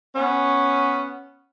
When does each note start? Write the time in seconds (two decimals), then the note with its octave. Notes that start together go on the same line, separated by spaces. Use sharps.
0.16 B3 C#4